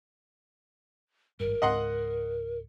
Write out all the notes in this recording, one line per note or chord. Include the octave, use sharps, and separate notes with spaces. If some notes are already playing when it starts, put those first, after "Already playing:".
G#1 G2 A#4
C#2 G#2 D#5 F#5 C6